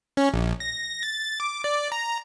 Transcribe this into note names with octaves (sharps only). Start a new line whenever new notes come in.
C#4
A#1
A#6
A6
D6
D5
A#5